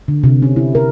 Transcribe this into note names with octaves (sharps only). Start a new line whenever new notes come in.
D3
C3
C#4
E4
A#4